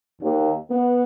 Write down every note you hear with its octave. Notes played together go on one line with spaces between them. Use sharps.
D#2
B3